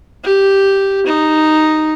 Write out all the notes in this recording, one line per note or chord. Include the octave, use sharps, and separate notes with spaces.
G4
D#4